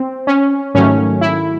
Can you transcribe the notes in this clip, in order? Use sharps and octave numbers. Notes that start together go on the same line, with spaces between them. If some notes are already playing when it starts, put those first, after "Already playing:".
Already playing: C4
C#4
G#2 D#3 F#3 A3 C#4
E4